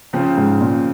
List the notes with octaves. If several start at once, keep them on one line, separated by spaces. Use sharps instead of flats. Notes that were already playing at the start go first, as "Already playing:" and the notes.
C#3 F3 C4
G#2
A#2